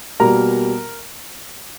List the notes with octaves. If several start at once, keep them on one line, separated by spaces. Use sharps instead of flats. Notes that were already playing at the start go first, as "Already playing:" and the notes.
B2 G3 A#3 A#4 A#5